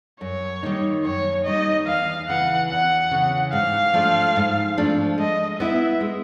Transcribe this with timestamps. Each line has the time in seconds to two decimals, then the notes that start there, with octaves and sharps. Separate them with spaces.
0.21 F#2 C#5
0.63 D#3 G3 A#3 D#4
1.04 F#2 C#5
1.45 D#3 G3 A#3 D#4 D#5
1.87 E2 F5
2.28 C#3 E3 F#5
2.70 E2 F#5
3.11 C#3 E3
3.53 G#2 F5
3.93 F3 A3 D4
4.36 G#2
4.78 F3 A3 D4
5.18 G#3 D#5
5.60 B3 E4 E5
6.01 G#3